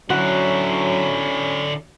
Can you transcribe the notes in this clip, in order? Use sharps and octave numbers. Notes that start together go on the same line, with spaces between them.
D3 F#3 C#4 E4 F#4